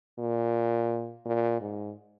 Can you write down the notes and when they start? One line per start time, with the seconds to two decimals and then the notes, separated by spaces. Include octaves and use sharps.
0.19 A#2
1.25 A#2
1.61 G#2